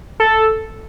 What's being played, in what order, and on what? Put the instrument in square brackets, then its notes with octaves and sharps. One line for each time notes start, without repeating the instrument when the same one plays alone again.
[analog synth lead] A4